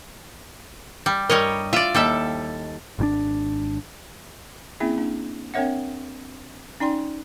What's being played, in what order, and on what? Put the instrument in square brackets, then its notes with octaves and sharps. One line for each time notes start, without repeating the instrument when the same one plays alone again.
[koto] G3
[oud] G2 A#4 [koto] G3 C#5 D#5
[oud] F4 [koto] D5 E5
[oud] D#2 [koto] G3 A4 E5
[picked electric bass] G#1 D#3 D4
[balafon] A#3 C4 C#4 E4 G#4 E5
A#3 D4
C4 D4 A#4 C#5 E5 F#5
C#4 D#4 D5 G5 C6